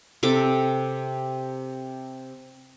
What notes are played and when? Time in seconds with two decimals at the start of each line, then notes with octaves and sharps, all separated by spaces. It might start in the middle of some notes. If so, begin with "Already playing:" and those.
0.23 C3 A4 D6